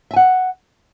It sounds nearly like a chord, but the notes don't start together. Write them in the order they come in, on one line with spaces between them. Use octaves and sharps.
E5 G#5 F#5